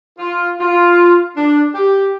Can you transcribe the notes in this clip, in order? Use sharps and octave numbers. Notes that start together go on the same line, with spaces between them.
F4
F4
D4
G4